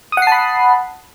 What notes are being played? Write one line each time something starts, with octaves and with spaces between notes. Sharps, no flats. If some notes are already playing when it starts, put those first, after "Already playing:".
F#5 A5 B5 D#6 C7